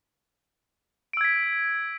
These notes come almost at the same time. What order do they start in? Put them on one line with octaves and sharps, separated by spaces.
D7 E6 G#6 B6